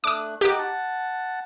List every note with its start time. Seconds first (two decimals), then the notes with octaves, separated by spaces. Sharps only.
0.04 A3 D4 D6 D#6 F#6
0.41 D#4 F#4 G4 D6 F#6
0.59 F#5 A5